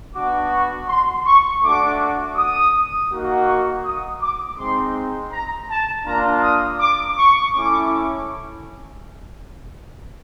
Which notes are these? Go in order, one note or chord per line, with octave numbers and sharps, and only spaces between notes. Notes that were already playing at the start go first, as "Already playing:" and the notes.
B3 D4 F#4 D6
C#6
C6
C#6
A3 D4 F#4 D6
D#6
A#3 D#4 F#4
C#6
D#6
D6
G#3 C4 D#4 C6
A#5
A5
A#3 D4 F4 A#5
D#6
D6
C#6
A3 C#4 E4 D6